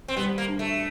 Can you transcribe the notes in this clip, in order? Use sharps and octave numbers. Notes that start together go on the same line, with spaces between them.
C4
G3 B3
A#3
D4
A3